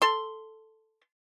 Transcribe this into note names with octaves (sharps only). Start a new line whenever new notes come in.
A4 C6